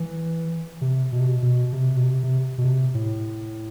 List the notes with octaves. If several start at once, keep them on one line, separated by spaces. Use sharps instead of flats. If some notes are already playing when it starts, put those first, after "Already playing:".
Already playing: E3
C3
B2
C3
B2
B2
C3
B2
C3
C3
B2
C3
A2